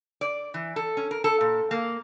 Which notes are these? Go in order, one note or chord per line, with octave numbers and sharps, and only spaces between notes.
D5
E3
A4
C#4
A#4
A4
A#2
A#3